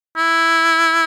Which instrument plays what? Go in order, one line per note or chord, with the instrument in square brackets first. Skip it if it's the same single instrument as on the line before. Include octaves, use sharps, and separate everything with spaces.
[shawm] E4